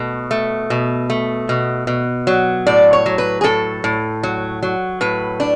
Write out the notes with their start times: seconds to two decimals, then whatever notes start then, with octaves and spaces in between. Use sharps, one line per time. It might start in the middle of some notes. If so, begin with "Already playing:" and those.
Already playing: B2 A3
0.31 A3
0.70 B2
1.10 A3
1.49 B2
1.87 B2
2.27 F#3
2.67 A2 D5
2.93 C#5
3.06 F#3
3.18 B4
3.41 G#4
3.44 A2 A4
3.84 A2
4.23 F#3
4.63 F#3
5.01 A2 B4
5.40 D4